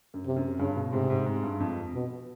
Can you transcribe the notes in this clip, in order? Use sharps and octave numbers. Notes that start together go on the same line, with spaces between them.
F#2
C3
F#2
G2 C#3
B2
G#2 C3
G#2
G#2
G2
F2
B2